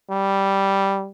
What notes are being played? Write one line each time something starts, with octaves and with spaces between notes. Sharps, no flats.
G3